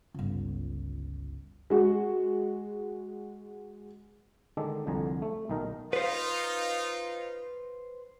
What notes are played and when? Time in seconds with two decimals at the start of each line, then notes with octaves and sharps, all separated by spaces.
0.14 G1 C#2
1.70 G#3 F#4
4.57 D3 D#3 G#3 A4 D5
4.87 C2 F2 D3 G#5 A#5
5.22 A3
5.49 B1 D#3 D#4 A#4
5.93 D#4 F4 B4 C5